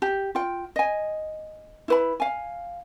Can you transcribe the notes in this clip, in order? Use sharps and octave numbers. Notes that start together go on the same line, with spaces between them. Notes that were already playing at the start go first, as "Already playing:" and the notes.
G4
F4 G5
D#5 G#5
E4 B4 B5
F5 G#5